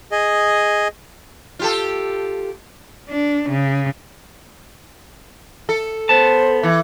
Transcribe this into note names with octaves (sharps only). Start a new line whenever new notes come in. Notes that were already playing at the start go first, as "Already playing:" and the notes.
G#4 D#5
F4 G4 A4
D4
C#3
A4
B3 C5 A5
E3